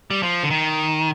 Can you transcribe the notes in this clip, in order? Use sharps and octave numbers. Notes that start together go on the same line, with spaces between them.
G3
F3
D3
D#3